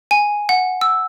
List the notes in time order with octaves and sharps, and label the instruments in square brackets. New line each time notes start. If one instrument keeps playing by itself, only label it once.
[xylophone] G#5
F#5
E6